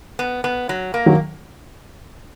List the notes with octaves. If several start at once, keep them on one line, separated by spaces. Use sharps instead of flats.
B3
B3
F#3
A#3
D#3 F#3